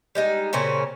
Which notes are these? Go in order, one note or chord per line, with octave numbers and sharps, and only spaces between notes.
G3 G#3 D#4
A#2 C#3 C4 C#4